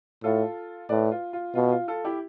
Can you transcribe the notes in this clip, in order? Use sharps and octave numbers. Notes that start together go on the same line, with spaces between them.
A2 F4 A4
A2 B4 D5
F4
F4
B2 F4
F4
F4 A4
E4 G4